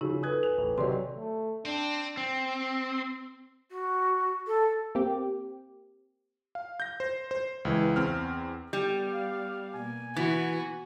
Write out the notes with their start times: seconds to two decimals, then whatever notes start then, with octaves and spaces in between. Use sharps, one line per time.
0.01 C#3 F3 D#4 F#4
0.23 A4 B4 G#5 D#6 F#6 G#6
0.43 F7
0.58 A1
0.78 C3 D#3 F#3 C#5 D5 C6
1.17 A3
1.66 C4 D4
2.17 C4
3.71 F#4
4.47 A4
4.95 A#3 C4 G4
6.55 F5
6.80 G6 A#6
7.00 C5
7.31 C5
7.65 C#2 E3
7.96 E2 C4 F6
8.73 G3 B3
9.13 F5
9.74 B2 A#3 G#5
10.16 E3 B3 F#4